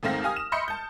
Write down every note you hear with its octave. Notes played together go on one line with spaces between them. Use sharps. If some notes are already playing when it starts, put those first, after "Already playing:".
D#2 G#2 A3 C4 F5 A#6
G4 F5 G#5 D#6 F6
E7
D#5 E5 B5 C6 G6 C#7
A5 G6